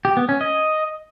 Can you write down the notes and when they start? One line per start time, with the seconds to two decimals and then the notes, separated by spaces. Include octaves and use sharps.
0.05 G4
0.17 B3
0.29 C#4
0.41 D#5